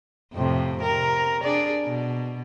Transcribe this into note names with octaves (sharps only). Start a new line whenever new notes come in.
F2 A2 C3
C3 A#4
D4 G#4 D5
B2